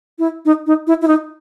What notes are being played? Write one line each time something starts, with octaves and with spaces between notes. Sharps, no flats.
E4
D#4
D#4
E4
E4
D#4